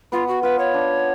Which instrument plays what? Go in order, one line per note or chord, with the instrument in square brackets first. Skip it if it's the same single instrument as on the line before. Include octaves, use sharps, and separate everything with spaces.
[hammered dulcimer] B3 [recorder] F4
[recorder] F#4
[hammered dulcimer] F4 [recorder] B4
[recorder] C#5
[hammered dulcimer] D4